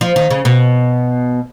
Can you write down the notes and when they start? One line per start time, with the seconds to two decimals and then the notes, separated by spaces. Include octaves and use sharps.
0.01 F3
0.16 D#3
0.30 C#3
0.45 B2